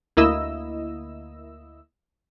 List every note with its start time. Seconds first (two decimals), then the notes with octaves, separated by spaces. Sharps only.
0.17 D2 A#3 E4 D#5 E6